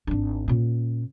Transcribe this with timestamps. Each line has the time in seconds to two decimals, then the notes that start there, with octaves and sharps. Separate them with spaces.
0.07 G#1 D4
0.48 A#2 C#4